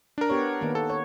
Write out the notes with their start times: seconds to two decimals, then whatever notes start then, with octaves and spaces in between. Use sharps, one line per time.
0.18 D4 A#4
0.30 B3 G4 C#5
0.61 D#3 A#3 B3
0.75 A4
0.90 C#5